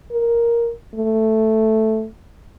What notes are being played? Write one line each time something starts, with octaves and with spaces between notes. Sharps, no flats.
A#4
A3